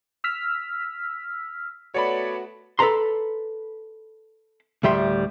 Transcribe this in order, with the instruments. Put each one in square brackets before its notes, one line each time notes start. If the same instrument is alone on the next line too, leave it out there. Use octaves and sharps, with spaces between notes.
[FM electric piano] E6 F6 B6
[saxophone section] A3 B3 F#4 [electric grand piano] C#5 D5 B5
[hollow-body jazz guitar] A4 B4 D5 A#5 C6
D2 A2 G3 E5 G5 C6